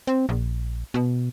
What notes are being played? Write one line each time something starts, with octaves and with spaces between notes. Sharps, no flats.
C4
A#1
B2